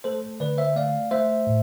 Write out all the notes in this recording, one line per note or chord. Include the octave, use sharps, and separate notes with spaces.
A3 A4 C5
D3 B4 D5
C5 E5
A3 D5 F5
A3 C5 E5
A2